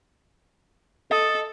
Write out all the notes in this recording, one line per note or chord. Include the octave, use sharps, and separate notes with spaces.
A4 D#5